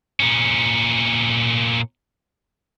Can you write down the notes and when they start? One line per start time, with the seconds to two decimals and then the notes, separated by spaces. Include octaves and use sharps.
0.20 A#2 C#4